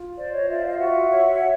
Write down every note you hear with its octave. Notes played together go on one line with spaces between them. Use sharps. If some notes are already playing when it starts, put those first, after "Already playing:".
Already playing: F4
C5 D5
C#5 D#5
F4 D5 E5
D#5 F5
F#4 E5 F#5
C#5
C#5